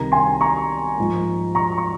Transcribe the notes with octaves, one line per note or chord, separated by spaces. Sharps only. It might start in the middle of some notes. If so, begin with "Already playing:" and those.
Already playing: C2 C3 D#3 A#5
G#5 C6
A#5 C#6
G#2 F3 A#3
A#5 C#6
C#6